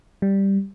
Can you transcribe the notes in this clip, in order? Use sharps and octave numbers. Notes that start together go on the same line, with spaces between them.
G3